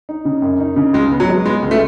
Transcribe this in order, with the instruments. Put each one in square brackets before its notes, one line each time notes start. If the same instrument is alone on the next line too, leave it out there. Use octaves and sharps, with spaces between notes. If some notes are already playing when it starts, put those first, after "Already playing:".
[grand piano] D#4
C#3
F#2
D#4
C#3
[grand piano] C#2 [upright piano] G#3
[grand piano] B3
[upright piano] F#3
[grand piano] G#3
[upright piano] G#3 [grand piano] B3
[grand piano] C#2
[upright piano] A3